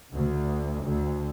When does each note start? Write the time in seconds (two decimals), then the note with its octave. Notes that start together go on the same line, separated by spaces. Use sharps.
0.14 D2
0.85 D2